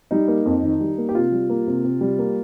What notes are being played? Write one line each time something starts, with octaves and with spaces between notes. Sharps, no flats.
G3 D#4
A#3
F2
D#3
G3
A#3
G4
C3 F4
G3
A#3
C3
C3
G3
A#3